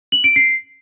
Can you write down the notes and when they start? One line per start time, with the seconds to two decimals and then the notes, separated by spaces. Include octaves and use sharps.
0.12 F#7
0.24 D7
0.36 C7